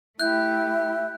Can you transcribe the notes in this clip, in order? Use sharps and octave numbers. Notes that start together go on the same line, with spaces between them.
A3 E4 G4 E5 F#6 G6